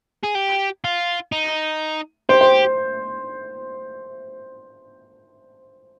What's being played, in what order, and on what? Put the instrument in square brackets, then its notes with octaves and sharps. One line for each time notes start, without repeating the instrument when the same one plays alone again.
[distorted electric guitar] G#4
G4
F4
D#4
[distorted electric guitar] G4 [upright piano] C5
[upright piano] C5